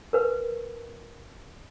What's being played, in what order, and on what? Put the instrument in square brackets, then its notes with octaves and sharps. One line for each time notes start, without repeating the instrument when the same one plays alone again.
[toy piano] A#4 B4